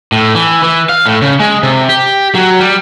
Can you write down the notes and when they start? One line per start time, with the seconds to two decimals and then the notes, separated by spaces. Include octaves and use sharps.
0.12 A2
0.35 E3
0.63 E3
0.89 F5
1.06 A2
1.22 C#3
1.40 G#3
1.63 C3
1.89 G4
2.35 F#3
2.59 G3